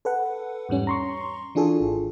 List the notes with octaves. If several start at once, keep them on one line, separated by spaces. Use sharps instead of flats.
A4 B4 F#5
E2 G#2 G3 C#4
A#5 C6 C#6
E3 D4 F4 G#4 A4
G#1